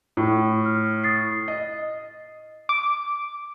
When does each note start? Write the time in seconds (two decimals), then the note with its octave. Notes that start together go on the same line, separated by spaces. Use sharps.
0.17 A2
0.65 F6
1.04 D#6 A6 C7
1.48 D#5
2.69 D6